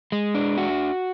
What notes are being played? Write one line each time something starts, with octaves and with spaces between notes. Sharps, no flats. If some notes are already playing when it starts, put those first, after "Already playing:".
G#3
D4
F#4